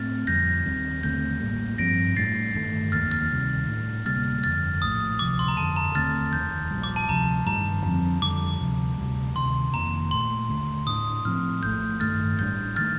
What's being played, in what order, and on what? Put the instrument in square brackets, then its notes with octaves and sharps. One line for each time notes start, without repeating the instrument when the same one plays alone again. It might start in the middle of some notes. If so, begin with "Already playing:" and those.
Already playing: [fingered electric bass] A2 A3 C4 [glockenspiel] F6 A6
[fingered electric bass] F2 D3 G3 [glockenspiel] G6 A#6
[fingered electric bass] D#2 D#3 G3 C4
[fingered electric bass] D#2 D3 A3 C4 [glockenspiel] G6
[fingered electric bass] A1 A2 G3 A#3
[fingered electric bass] G2 F3 C4 [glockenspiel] A#6 D7
[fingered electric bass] A2 G3 D4 [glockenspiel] A6 C7
[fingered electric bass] G1 G2 D#3 A3
[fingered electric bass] F1 D#2 D#3 A#3 [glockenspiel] F6 A6
[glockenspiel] F6 A6
[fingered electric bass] D2 C3 D#3 G3
A2 G3 D4
[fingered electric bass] D2 C3 G3 A#3 [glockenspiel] F6 A6
[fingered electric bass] G1 F2 D3 [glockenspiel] F6 A6
[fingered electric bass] A#1 A2 A3 [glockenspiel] D#6
[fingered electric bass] D2 C3 F3 [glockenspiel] D6
[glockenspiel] C6
A#5
[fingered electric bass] G1 F2 D3 [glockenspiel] A5
[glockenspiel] A#5
[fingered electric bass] D#2 D3 A3 C4 [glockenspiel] F6 A6
[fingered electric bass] F1 D#2 D#3 [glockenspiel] G6
[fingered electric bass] A#1 A#2 G3
[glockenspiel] D6
A5
[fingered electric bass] D2 C3 F3 [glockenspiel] A#5
[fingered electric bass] A1 G2 D#3 G3 [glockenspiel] A#5
[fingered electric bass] F2 D3 F3 C4
[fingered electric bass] F2 D3 G3 [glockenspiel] D6
[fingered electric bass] D2 C3 F3
D2 C3 G3
[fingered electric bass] D2 C3 D#3 [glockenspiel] C6
[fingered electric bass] F1 F2 D#3 A#3 [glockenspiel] A#5
[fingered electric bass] A#1 A#2 A3 [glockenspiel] C6
[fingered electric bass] D#2 D3 A3
[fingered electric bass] A2 G3 D4 [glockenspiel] D#6
[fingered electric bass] A2 F3 C4 [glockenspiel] F6
[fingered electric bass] A#1 A2 A3 [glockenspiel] G6
[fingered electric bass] G2 D#3 A3 [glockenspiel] F6 A6
[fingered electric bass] A1 A2 G3 D4 [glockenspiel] G6
[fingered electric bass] D#3 A3 [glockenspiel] F6 A6